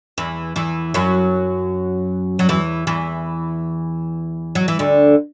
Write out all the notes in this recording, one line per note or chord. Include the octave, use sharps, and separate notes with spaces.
E2 E3
E2 E3
F#2 F#3
F#3
E2 E3
E2 E3
F#3
E3
D2 D3